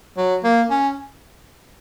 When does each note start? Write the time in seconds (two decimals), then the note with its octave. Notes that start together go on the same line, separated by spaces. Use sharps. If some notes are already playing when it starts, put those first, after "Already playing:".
0.17 F#3
0.44 A#3
0.70 C#4